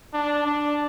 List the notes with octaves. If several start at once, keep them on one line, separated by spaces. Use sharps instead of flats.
D4
D4